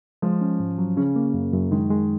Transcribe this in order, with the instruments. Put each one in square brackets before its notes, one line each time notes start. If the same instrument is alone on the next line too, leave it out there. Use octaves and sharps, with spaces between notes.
[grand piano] F3 [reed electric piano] G#3
[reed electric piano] C#4
G#2
F#3
[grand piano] C#3 [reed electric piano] C#4
[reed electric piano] A#3
F#2
F#2
[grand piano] D#3 [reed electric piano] G#3
[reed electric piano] G#3